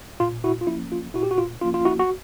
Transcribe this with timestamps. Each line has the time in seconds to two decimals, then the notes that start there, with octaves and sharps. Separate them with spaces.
0.20 A#2 F4
0.44 E4 F#4
0.61 F4
0.67 F3 A#3 C#4 E4
0.92 F4
1.14 A#2 E4 F#4
1.23 G4
1.31 F#4
1.38 F4
1.61 F3 A#3 C#4 F4
1.74 F4
1.85 E4 F#4
1.99 F#4